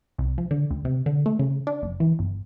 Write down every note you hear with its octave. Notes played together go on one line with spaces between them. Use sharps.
C2
F3
D3
D2
C3
D3
A3
C#3
D4
F#1
E3
G1